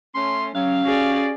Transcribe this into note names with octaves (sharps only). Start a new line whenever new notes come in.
A3 C#4 C6
F#3 C#4 G4 C#5 F5
F#4 G#4 D5